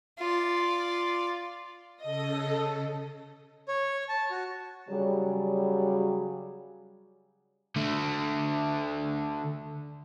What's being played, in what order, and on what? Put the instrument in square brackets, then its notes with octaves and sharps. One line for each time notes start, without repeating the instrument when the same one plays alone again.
[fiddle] F4 D5
[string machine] C#3 A4 [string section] D#5
[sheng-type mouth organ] C#5
A5
F#4
[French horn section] C#3 F#3 G3
[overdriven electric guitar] D3 A3